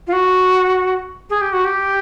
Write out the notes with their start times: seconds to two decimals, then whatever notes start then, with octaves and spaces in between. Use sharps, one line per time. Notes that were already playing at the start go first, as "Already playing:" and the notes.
0.07 F4
0.12 F#4
1.30 G#4
1.41 G4
1.53 F#4
1.64 G4